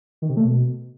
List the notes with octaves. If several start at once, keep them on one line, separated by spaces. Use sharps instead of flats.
D#3
C3
A3
B2